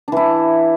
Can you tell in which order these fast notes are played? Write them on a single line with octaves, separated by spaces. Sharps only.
D4 E3 E4